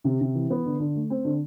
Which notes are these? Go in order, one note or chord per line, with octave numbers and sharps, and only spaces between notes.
C3
C3
E3
B3
D3
D3
A3
C4
D3